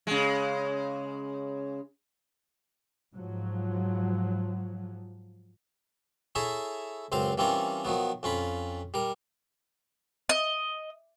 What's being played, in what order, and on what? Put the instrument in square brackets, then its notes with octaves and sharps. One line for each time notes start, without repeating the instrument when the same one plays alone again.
[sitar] C#3 G#3
[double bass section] G#2 F3 F#3
[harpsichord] E4 G#4 A4 C#5 E5
C#2 F#2 C4 C5 F5 C6
E3 G3 C4 C#4 F4 A#4
D#3 F3 F#3 B3
F2 C#4 F4 B5
G3 A#4
[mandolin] D#5